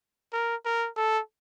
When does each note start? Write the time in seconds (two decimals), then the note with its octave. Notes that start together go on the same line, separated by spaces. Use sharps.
0.33 A#4
0.65 A#4
0.97 A4